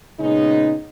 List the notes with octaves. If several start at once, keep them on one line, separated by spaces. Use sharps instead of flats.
A#2 C#3 G#3 B3 C#4 D#4